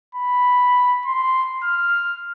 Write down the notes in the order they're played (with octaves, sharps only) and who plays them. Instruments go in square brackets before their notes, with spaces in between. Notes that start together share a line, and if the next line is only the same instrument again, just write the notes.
[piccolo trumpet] B5
C6
F6